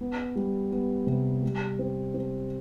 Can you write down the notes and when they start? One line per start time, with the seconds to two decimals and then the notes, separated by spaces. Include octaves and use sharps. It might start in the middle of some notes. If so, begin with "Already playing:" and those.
0.01 B3
0.36 G3
0.72 B3
1.07 C3
1.43 G3
1.79 C4
2.14 C4